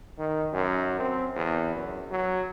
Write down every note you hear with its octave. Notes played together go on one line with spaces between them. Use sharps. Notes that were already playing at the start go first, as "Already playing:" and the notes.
D#3
F#2
C4
E2
F#2
F#3